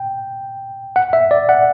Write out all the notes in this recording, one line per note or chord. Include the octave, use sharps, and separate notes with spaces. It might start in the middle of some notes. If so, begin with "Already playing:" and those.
Already playing: G5
F#5
E5
D5
F#5